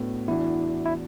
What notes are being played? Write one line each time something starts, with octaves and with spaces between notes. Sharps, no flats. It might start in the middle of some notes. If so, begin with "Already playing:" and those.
Already playing: A2 A3 B3 D4 F#4
E2 E3 D4 E4 F#4
E4